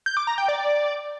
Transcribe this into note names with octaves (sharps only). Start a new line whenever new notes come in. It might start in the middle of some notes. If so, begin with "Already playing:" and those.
G6
D6
A#5
G5
D5